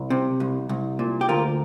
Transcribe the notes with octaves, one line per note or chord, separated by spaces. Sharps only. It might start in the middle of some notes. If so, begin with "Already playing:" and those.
Already playing: C2
C3
C2
C2
A#2
G4
D2 F4 A#4